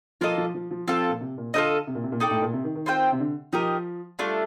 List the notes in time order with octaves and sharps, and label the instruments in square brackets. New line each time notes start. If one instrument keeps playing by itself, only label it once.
[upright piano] F3 [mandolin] A#3 F4 A4 D#5
[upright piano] F3
F3
F3
[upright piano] F3 [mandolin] C4 F4 A4
[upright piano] A#2
C3
A#2
[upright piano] D3 [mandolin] F4 A4 C5 D#5
[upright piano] C3
A#2
C3
A#2
[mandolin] D#4 A4 D5 G5
[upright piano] A2
A#2
C3
D#3
D#3
[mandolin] C4 F4 C5 G5
[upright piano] C3
D3
[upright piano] F3 [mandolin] D#4 G4 A#4 D#5
[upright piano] G3 [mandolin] A3 D4 F4 A4